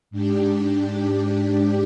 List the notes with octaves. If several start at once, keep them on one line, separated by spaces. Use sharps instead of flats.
G#2 D4 G4